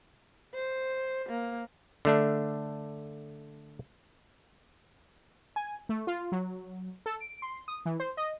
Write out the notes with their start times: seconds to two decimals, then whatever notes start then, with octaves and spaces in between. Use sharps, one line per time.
0.54 C5
1.29 A#3
2.05 D3 A3 D4
5.56 G#5
5.89 A3
6.07 F4
6.32 F#3
7.06 A4
7.20 D7
7.42 C6
7.68 D#6
7.86 E3
8.00 C5
8.17 D#5